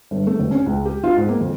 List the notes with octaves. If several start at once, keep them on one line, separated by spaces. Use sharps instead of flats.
G1
A3
F1
C#4
C#2
G4
F4
G#2
A#3
F2